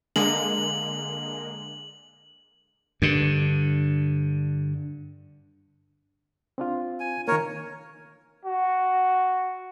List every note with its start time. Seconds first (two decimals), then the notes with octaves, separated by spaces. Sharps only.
0.16 D3 G#3 A#3 F#7
3.02 G2 D3
6.58 C4 D4 F4
7.00 G#5
7.28 D#3 A#3 A#4 C#5
8.45 F#4